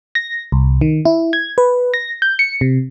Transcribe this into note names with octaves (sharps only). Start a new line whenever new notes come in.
A#6
C2
D#3
E4
G#6
B4
A#6
G6
C#7
C3